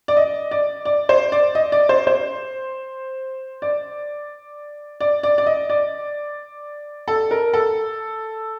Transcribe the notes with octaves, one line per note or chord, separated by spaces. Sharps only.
D5
D#5
D5
D5
C5
D5
D#5
D5
C5
C5
D5
D5
D5
D5
D#5
D5
A4
A#4
A4